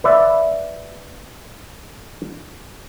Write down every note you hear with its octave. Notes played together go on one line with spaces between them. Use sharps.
B4 D5 E5